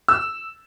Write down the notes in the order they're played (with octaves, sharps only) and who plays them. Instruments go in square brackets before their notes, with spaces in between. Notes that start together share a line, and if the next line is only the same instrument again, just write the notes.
[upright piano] E6